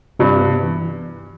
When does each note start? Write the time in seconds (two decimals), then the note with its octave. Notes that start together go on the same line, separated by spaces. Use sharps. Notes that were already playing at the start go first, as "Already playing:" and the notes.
0.19 G2 C3
0.41 B3
0.63 E3